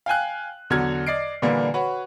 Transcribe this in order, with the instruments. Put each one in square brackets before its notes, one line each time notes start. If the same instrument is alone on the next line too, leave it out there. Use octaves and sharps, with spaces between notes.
[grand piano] F5 G5 G#5 F#6
E2 D3 F#3 F6 G#6
D5 D#5 C7 D7
A#2 D3 E3 G3 A#3
F#4 B4 C#5